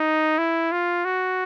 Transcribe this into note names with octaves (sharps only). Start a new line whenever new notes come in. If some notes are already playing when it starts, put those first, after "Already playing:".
Already playing: D#4
E4
F4
F#4